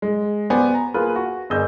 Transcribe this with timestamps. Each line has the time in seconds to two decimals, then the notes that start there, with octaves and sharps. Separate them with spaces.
0.02 G#3
0.50 B3 G4 C5 D5 G#5
0.74 A#5
0.94 A#3 F4 G#4 B4
1.16 F#4
1.50 G1 G#4 A#4 D#5 E6 G6